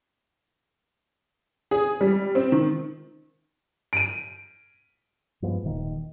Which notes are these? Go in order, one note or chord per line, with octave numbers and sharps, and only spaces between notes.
G#4
G3
C4
D#3
D7 D#7
G2 F3 G#3 B3
D#1 A#2 D#3